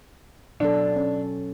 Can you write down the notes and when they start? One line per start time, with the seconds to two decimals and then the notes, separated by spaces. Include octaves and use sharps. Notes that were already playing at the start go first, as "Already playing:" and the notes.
0.60 B2 F#3 D4 A4
0.96 C#4